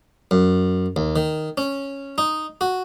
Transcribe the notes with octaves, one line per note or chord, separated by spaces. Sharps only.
F#2
D#2
D#3
C#4
D#4
F#4